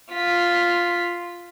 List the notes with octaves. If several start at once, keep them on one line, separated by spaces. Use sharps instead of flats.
F4 B6